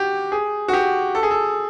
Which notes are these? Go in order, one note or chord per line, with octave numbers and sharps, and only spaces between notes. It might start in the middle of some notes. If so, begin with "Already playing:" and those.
Already playing: F#4 G4
G#4
F#4
G4
A4
G#4
A4